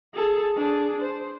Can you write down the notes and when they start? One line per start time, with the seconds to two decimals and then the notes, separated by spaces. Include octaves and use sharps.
0.14 G#4 A4
0.56 D4 G#4
1.02 C5